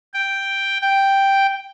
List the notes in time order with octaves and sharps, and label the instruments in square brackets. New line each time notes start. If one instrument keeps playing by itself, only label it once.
[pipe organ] G5
G5